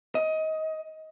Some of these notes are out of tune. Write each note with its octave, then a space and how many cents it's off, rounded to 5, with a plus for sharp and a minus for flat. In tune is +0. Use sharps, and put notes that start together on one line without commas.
D#5 +20